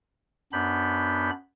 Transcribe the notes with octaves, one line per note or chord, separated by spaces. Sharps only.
F#2 B3 D4 B5 G6